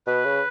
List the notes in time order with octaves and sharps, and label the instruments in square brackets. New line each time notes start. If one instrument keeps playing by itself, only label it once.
[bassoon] B2 [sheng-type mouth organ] B4
[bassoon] C#3